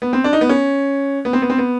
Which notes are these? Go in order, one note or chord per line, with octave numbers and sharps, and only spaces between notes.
B3
C4
D4
D#4
B3
C#4
B3
C4
B3
C4
B3